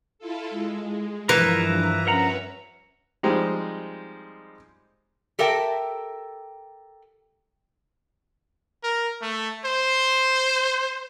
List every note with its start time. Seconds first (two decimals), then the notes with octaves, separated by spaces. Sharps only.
0.19 E4 F4 A4
0.50 G#3
1.29 G2 E3 F3 A#4 E5 A#5
2.07 C#4 A#4 B4 E5 F#5 A#5
3.23 F3 G3 G#3 C4 D#4
5.39 G4 A4 A#4 E5 G5 A5
8.84 A#4
9.22 A3
9.65 C5